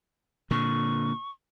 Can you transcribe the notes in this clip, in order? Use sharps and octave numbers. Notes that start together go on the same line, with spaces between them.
A#2 D3 C#6